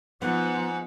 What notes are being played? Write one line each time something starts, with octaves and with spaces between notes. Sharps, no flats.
G#2 F3 B3 F#5